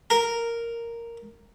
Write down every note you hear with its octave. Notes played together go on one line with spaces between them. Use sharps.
A#4